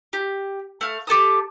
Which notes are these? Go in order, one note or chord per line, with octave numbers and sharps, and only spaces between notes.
G4
A3 F5
G4 A4 A5 D#6